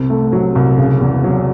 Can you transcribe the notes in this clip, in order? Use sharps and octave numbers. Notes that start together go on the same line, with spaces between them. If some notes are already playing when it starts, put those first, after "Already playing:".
Already playing: C2 C3
A3
F#3
C2
C#3
E2
F#3